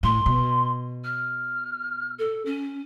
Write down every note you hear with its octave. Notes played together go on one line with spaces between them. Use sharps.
A2 C6
B2
F6
A4
C#4